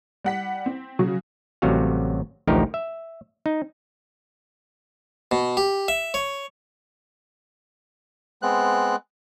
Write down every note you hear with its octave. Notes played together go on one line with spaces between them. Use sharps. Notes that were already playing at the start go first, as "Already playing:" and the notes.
G3 F#5 B6
C4
C#3 F#3 F#4
A1 C3 F#3 G3 F#4 F5
A1 D2 F3 D#4 G4 A#4
E5
D#4
B2
G4
E5
C#5
G#3 B3 C4 F#6